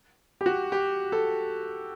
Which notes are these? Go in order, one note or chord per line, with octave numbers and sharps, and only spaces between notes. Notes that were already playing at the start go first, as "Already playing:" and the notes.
G4
F#4
G4
A4